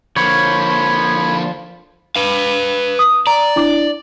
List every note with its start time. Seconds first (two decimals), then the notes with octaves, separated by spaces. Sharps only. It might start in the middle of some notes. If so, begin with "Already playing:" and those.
0.16 D3 F3 A#3 C#5 B5
2.16 B4 F5
2.99 D#6
3.27 D5 A#5
3.56 D4 E4 D6